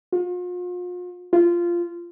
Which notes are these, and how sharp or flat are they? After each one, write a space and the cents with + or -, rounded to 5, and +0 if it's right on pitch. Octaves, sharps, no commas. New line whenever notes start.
F4 +40
F4 -15